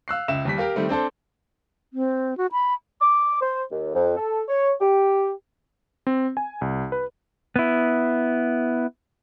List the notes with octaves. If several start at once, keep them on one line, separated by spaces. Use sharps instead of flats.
F5 E6 F#6 C7
C#2 E5 E7
D#2 G3 B6
G4 A#4 F5
D#3 G3 A3 C4
C4 D4 A4 C5
C4
F#4
B5
D6
C5
D#2
F2
A4
C#5
G4
C4
G#5
C2
B4
B3 E4